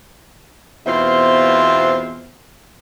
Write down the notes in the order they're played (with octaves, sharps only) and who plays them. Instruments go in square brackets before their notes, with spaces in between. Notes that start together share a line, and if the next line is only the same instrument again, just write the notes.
[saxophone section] E2 B2 C4 F4 C5 E5